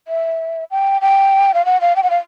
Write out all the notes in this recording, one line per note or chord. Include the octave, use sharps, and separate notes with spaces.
E5
G5
G5
F5
F#5
F5
G5
F#5
F5